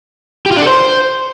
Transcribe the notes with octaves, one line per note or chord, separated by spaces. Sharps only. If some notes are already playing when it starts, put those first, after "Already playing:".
G4
F4
D4
A4
C5